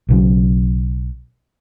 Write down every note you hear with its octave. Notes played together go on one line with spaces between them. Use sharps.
B1 C#3 F#3